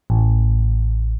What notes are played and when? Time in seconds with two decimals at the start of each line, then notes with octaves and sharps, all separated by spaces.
0.10 A1